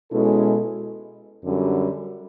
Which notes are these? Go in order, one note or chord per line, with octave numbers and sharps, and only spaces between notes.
B2 G#3 C#4 E4 A4
F#2 D3 G3